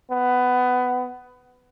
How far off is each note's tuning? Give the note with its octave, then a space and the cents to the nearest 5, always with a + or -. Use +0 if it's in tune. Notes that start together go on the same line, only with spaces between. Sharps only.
B3 +15